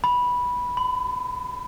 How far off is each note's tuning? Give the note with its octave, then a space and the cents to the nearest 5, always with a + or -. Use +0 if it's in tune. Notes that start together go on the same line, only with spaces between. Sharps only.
B5 -10
B5 +35